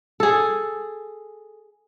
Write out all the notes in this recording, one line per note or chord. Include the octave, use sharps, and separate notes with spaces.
G#4 A4